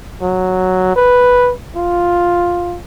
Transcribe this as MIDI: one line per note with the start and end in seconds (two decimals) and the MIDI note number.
0.22 0.93 54
0.96 1.52 71
1.76 2.78 65